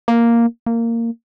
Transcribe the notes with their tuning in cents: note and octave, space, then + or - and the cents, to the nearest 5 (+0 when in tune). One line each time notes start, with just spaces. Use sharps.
A#3 +0
A#3 -15